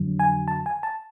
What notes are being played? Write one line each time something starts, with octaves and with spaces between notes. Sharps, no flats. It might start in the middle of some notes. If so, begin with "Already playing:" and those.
Already playing: F2 D3 F#3
G#5
A5
G#5
A5